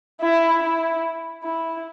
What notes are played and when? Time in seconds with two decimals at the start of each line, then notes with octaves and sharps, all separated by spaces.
0.21 E4
0.62 E4
1.44 E4